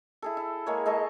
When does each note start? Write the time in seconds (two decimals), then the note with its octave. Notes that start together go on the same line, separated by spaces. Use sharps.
0.22 E4 G#4 A4
0.37 E4
0.66 G#3 A#3 C#5
0.86 G#3 A4 D#5 C#6